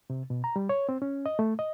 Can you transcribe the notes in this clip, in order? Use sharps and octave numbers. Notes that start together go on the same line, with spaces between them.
C3
B2
A#5
G3
C#5
C4
C#4
D#5
A3
D#5